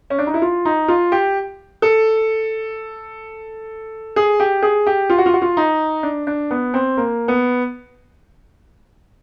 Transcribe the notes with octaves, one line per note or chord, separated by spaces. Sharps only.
C#4
D4
D#4
E4
F4
D#4
F4
G4
A4
G#4
G4
G#4
G4
F4
F#4
F4
F#4
F4
D#4
D4
D4
B3
C4
A#3
B3